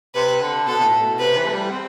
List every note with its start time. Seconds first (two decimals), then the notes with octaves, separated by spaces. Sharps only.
0.15 C3 B4
0.41 D3
0.67 B2 A4
0.79 B2
0.84 A2
1.02 B2
1.19 C3 B4
1.37 E3
1.48 A3
1.53 G3
1.70 C4